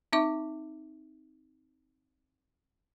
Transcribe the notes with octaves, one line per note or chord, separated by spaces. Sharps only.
C4 D#4 E5 D6